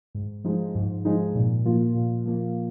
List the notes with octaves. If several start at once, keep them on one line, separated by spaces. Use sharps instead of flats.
G#2
F3 G#3 D#4
G#2
F3 G#3 D#4
A#2
F3 A#3 F4
A#2
F3 A#3 F4